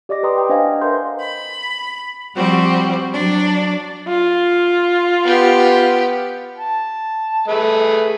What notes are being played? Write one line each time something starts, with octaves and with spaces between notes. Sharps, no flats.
G4 D5 D#5 D6 A#6
B4 D#5 G5 A#5 C6 D#6
G5 A#5
D4 C5 D#5 F5 G#5 A#5
F#5
A#4 B4 E5 A#5 C6 G6
B5
F3 G3 C4 F#4
F#3 D4
F4
B3 G4
A5
A3 G#4 B4